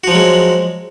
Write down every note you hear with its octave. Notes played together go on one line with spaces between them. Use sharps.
F3 F#3 G#3 F#4